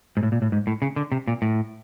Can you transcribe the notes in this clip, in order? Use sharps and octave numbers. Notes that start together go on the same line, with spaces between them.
G#2
A2
A#2
A2
G#2
A2
C#3
D3
C3
A#2
A2